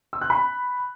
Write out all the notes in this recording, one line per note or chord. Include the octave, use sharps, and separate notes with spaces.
E6
F#6
B5